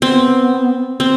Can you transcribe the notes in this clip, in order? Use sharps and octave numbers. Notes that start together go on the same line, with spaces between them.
B3 C4
C4